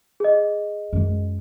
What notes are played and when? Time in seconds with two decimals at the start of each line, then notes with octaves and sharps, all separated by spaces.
0.20 G#4 D#5
0.93 F#2 G#3